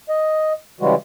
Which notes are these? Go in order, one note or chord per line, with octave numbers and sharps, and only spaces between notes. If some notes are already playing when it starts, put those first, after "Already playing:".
D#5
C#3 E3 G3 G#3 F#4